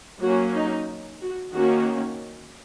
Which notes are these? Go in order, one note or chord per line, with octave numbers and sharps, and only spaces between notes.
F#3 A#3 C#4 F#4
D#4
F#4
D#3 A#3 C#4 F#4